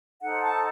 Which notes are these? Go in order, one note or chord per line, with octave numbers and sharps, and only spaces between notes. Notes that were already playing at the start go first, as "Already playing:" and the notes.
D#4 A4 C5 F#5
A5